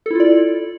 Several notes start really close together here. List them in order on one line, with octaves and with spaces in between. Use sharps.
A4 E4 F4 D5